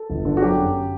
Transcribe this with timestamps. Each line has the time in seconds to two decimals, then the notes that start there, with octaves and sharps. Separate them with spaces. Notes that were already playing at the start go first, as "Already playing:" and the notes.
Already playing: A4
0.10 G1
0.25 D3
0.37 F#4
0.42 F#3 G4
0.59 F#2